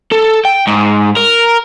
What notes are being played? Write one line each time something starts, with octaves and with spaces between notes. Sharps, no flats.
A4
G5
G#2
A#4